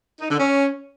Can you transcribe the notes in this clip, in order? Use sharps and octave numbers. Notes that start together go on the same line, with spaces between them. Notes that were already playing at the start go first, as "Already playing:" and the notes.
D#4
D3
C#4